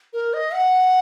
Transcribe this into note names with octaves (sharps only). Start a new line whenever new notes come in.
A#4
D#5
F#5